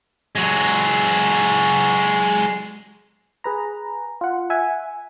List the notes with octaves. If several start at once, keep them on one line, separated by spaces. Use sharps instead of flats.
F#3 G#3
G#4 B4 A#5
F4 F#5
E5 F#5 G#5